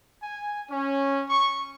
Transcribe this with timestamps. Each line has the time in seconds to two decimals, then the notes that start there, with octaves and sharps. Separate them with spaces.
0.22 G#5
0.68 C#4
1.29 C#6